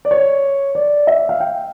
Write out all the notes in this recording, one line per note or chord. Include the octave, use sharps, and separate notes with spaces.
D5
C#5
D5
E5
F5
G5